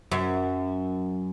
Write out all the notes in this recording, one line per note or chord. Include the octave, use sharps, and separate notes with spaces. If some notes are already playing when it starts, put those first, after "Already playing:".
F#2